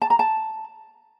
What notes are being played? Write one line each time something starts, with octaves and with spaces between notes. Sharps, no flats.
A5
A#5
A5